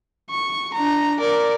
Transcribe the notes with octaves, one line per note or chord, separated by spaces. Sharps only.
C#6
D4 A#5
A#4 D5